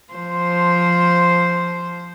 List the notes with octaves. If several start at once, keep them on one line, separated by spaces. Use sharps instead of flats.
F3 C5